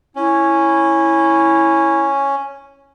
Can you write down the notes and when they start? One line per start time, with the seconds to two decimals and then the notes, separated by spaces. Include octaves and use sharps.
0.16 C#4 E4